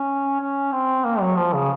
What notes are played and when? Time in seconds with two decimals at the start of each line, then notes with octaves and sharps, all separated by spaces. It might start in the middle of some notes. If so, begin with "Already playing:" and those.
Already playing: C#4
0.40 C#4
0.72 C4
1.05 A#3
1.20 F#3
1.36 F3
1.54 C#3